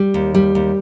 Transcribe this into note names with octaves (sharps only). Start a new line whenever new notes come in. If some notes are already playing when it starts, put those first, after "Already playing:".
Already playing: G3
D#2
G3
D#2